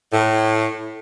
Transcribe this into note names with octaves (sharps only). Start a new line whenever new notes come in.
A2